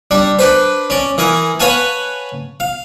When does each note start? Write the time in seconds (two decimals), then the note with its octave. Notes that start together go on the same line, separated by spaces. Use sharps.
0.11 G3 D4
0.39 D4 B4 C5
0.90 C#4 D5
1.18 E3 G#4 A#4
1.60 B4 C#5 F5 F#5 G#5 A5
2.60 F5